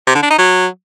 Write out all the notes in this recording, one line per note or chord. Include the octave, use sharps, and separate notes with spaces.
C3
D3
D4
D#4
F#3